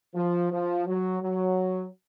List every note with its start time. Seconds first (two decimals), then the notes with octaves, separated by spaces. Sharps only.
0.15 F3
0.51 F3
0.87 F#3
1.22 F#3